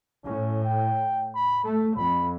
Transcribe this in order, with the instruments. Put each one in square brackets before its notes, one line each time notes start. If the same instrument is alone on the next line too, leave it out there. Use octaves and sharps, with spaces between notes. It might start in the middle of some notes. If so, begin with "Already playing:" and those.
[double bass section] A2 [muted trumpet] C#4
[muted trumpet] G5
B5
[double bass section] A3 [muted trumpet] A4
[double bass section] F2 [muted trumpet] B5